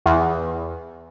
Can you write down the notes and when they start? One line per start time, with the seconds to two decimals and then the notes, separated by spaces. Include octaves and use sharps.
0.06 E2